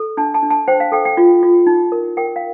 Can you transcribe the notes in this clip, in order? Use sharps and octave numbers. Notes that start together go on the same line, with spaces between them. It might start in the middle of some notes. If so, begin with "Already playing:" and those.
Already playing: A4
D4 A5
A5
D4
A5
C5 G5
F5
A4 G5
G5
F4
F4
D#4
A#4
A#4 G5
F5